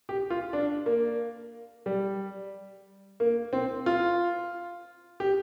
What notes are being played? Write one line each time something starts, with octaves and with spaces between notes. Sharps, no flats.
G4
F4
D4
A#3
G3
A#3
C4
F4
G4